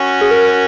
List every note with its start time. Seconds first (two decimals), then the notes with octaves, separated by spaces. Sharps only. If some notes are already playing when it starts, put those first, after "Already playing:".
Already playing: C#4 F#4
0.21 G#4
0.31 A#4